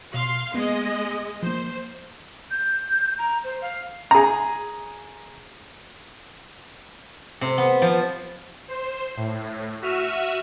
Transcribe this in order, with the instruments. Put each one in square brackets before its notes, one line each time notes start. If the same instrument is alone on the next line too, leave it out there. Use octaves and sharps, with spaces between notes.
[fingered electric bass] B2 [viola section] F5 C6
[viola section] G#3 D#5 [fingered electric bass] A#3 B3
[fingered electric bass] F3 A#3 [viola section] C5
[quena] G6
A#5
C5
F5
[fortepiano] G#4 A#5
[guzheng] C3
B3
F3
[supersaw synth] C5
A2
F#4 E5 F6 D#7 E7